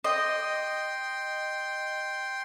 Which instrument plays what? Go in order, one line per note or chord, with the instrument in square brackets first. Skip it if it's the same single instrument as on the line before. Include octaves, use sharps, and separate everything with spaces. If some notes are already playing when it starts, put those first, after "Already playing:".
[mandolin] D#5 [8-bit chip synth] G5 C6